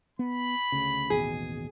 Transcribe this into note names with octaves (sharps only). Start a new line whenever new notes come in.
B3 B5
D2 C#3
A1 D#2 B2 G#4